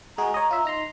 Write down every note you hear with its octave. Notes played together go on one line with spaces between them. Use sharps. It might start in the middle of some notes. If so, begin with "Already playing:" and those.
G#3 F#4 G#4 A#5
C#5 D#5
F4 E5
D#4 A#5 C6